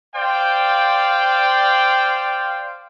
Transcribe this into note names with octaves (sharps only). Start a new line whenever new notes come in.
C5 D5 F5 G5